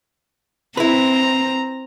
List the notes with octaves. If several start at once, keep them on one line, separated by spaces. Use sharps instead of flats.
C4 E4 B4 A#5